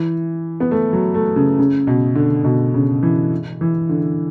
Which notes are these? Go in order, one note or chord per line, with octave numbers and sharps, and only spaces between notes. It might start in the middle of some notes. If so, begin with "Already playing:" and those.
Already playing: E3
B3
A3
F#3
A3
C#3
C#3
B2
D3
B2
C#3
E3
E3
D3